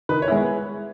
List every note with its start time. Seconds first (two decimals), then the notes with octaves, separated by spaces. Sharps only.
0.09 D#3 B4
0.22 C#5
0.28 G#3 B3 E4